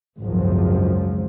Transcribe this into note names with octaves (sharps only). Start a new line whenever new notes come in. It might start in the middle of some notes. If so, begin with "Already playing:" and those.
G#1 C#2 F#2 F3 F#3